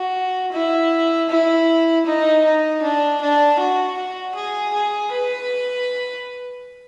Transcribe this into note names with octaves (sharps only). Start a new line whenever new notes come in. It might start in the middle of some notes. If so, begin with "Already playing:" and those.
Already playing: F#4
E4
E4
D#4
D#4
D4
D4
F#4
F#4
G#4
G#4
B4